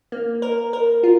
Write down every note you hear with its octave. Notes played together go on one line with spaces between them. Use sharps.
A#3
A#4
A#4
F4